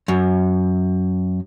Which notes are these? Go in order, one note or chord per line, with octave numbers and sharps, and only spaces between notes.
F#2